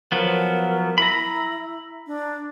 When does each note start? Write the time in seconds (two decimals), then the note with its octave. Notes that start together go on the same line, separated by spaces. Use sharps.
0.12 F3 F#3 B3 A#4
0.98 E4 A#5 B5
2.07 D4